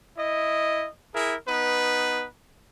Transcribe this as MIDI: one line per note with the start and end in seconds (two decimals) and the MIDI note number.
0.17 0.87 64
0.17 0.87 75
1.14 1.35 64
1.14 1.35 68
1.14 1.35 70
1.47 2.25 59
1.47 2.25 63
1.47 2.25 71